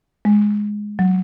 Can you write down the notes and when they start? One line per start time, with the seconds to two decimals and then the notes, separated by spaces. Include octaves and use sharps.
0.25 G#3
0.99 F#3